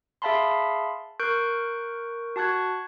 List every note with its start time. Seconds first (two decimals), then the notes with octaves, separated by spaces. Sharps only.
0.22 G#4 E5 F5 A5 B5 C6
1.20 A#4 C#6 F#6 G6 D7
2.36 F#4 A5 C#6 F#6 G#6